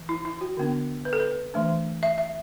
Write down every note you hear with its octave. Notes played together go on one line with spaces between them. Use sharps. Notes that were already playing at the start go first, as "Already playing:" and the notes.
Already playing: E3
E4
E4
F#4
D3 B3 D4
B4
A4
B4
E3 A3 D4
E5
E5